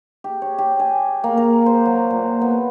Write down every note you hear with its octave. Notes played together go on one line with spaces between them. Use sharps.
G4
C#5
G4
G#5
A#3
A#4
C5
F#3
A#2
B3